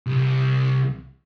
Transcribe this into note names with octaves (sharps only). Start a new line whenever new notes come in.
C2